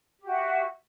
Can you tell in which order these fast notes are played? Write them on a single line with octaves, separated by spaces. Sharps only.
G4 F#4 E5